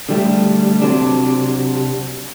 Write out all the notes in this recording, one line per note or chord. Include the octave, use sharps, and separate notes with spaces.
D3 G3 A3
C3 F#3 D4